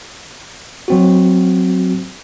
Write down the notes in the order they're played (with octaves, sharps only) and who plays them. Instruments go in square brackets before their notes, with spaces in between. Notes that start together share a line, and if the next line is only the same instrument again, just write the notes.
[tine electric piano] F#3 C4 F#4